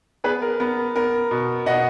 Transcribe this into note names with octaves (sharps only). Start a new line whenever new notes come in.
B3 G#4 B4
A#4
B3 A#4
B3 A#4
B2
B2 D#5 F#5